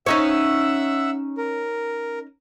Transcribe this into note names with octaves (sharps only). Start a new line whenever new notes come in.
C#4 D#4 C#5 E5 F#5 E6
A#4